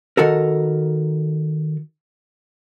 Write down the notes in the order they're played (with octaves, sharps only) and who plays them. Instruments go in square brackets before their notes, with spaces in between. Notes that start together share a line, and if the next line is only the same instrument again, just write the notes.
[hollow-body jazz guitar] D#3 F#4 A4 A#4